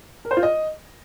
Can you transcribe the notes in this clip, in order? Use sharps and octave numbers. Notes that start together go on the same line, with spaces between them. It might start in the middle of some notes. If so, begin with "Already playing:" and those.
A#4
C5
F4
D#5